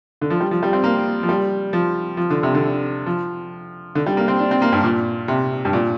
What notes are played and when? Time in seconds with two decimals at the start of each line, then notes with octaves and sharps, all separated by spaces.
0.22 D3
0.30 F3
0.40 G3
0.51 F3
0.63 G3
0.73 C4
0.84 A#3
1.23 F3
1.29 G3
1.73 F3
2.17 F3
2.30 D3
2.43 C3
2.55 D3
3.06 F3
3.95 D3
4.06 G3
4.17 A#3
4.28 C4
4.39 D4
4.51 C4
4.62 A#3
4.72 G2
4.84 A#2
5.28 C3
5.65 G2
5.73 A#2